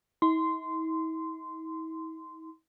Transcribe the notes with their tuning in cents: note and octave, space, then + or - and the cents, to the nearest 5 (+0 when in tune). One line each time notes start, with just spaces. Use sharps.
E4 -45 C6 -15